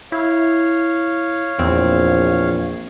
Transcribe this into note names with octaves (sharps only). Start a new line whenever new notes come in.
E4 C#5 F5
A#1 E2 C4